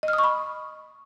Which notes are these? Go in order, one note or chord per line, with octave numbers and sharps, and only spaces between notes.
D#5
F6
D#6
C#6
B5